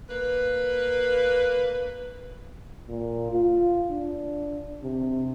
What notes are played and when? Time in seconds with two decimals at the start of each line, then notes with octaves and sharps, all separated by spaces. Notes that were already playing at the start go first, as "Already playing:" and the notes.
0.08 A#3 B4
2.88 A#2
3.32 F4
3.90 D4
4.83 C3